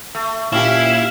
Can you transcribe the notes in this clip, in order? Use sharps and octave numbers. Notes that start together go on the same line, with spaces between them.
A3
A#2 C#4 E4 G4 F5